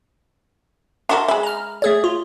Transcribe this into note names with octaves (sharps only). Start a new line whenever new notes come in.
D4 F#4 A#4 E5 A5 C6
G#3 E5 B5
A#5 F6
A3 G#4 C#5
F4